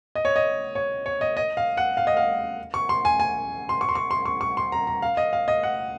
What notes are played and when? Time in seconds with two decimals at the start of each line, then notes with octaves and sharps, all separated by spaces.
0.15 D#5
0.25 C#5
0.36 D#5
0.75 C#5
1.06 C#5
1.21 D#5
1.37 D#5
1.57 F5
1.77 F#5
1.97 F5
2.07 D#5
2.17 F5
2.74 C#6
2.89 C6
3.05 G#5
3.20 G#5
3.69 C6
3.81 C#6
3.89 C6
3.95 C#6
4.11 C6
4.26 C#6
4.41 C#6
4.57 C6
4.72 A#5
4.87 A#5
5.02 F5
5.17 D#5
5.33 F5
5.48 D#5
5.63 F#5